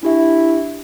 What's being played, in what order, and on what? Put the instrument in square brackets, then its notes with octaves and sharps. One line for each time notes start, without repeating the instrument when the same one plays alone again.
[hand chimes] D4 G4 E5 [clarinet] E4